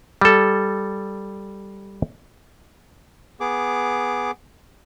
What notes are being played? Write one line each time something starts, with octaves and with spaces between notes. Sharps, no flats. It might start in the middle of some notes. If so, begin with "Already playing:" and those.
G3 A4
B3 G#4 D6